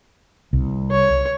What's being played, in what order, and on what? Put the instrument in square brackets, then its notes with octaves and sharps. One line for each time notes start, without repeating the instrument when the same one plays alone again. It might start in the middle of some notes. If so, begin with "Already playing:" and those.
[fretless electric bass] C2
[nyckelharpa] C#5